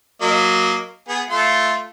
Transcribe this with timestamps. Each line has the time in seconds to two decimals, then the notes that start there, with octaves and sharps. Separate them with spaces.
0.21 F#3 A#3 D#5
1.08 B3 G#4
1.30 A3 F4 C6